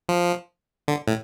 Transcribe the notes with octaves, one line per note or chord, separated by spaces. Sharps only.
F3
D3
A2